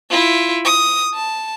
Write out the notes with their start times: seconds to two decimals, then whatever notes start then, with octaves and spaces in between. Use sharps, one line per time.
0.10 E4 F4
0.65 D#6
1.14 A5